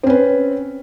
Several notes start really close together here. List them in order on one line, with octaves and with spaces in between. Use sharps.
C4 C#4 B4